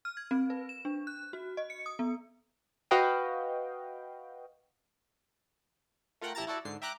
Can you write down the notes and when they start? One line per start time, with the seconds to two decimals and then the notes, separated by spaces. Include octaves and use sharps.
0.05 F6
0.17 G#6
0.31 C4
0.50 B4
0.69 E7
0.85 D4
1.07 F#6
1.33 F#4
1.57 D#5
1.70 C#7
1.86 D#6
1.99 B3
2.91 F#4 B4 D#5 F5 G5
6.21 A3 F4 A#4 F#5 G5
6.35 A1 E4 G4 A5 A#5 A6
6.47 E4 F#4 A4 D5
6.65 G#2 D3 C7
6.82 E5 G5 A#5 D6 F#6